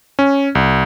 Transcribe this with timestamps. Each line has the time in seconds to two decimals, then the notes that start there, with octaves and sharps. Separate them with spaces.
0.19 C#4
0.55 C2